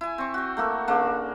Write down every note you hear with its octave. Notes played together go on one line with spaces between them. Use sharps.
E4 G#5
C4 C#6
F#4 G5
A3 A#3 F#4 A4
C#3 A#3 D4